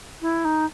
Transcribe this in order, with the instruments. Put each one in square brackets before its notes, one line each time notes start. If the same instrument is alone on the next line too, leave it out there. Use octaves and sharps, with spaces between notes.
[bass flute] E4
D#4